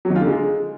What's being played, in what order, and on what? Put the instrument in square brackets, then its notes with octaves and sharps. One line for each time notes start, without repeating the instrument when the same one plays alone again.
[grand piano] F#3
D#3
F4
D3
G#3